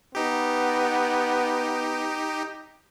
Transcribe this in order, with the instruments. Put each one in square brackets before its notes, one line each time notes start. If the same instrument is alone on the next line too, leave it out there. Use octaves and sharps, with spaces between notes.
[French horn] B3 [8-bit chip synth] D#4 G4